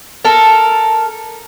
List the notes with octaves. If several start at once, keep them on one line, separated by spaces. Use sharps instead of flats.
A4 A#4